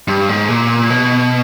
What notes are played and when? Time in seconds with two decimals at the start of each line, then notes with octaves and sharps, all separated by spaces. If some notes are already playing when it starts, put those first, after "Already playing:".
0.08 G2
0.29 G#2
0.48 A#2
0.90 B2